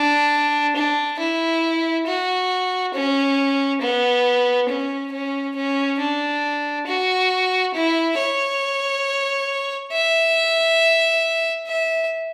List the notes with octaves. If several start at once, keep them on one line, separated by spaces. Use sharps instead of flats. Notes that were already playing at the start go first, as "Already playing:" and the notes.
Already playing: D4
D4
E4
F#4
C#4
B3
C#4
C#4
C#4
D4
F#4
E4
C#5
E5
E5